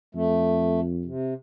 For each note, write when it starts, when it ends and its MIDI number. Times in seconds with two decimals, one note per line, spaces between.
0.15 1.10 41
0.15 0.80 57
1.05 1.34 48